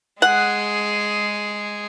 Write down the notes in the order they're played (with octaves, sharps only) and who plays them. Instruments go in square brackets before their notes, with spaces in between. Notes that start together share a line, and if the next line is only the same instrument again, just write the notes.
[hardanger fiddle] G#3 G#4 [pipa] F#5